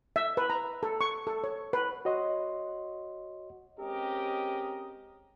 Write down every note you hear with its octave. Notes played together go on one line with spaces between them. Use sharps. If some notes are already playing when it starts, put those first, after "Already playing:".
E5
B4
A#5
A4
C#6
A4
C#5
B4
F#4 C#5 D#5 F#5 C6
G#3 C4 C#4 G4 A#4 D#5